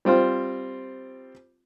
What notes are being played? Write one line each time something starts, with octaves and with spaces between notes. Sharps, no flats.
G3 C4 F4 C5